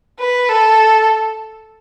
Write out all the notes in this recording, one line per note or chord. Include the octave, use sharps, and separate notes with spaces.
B4
A4